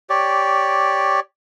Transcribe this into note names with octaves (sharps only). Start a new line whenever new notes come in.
G4 C#5 D5